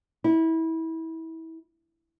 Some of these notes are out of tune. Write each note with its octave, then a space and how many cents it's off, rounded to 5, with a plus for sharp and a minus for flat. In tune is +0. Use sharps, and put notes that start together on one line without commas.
E4 -25